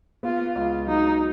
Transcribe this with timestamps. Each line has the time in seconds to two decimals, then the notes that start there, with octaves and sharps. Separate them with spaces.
0.23 B3 F4
0.55 C#2 F4
0.87 F#3 D#4